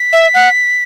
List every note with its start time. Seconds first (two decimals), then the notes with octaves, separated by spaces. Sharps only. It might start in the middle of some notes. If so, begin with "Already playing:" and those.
Already playing: B6
0.13 E5
0.34 F#5